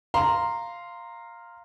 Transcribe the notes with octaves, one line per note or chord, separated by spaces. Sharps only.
F5 A#5 C6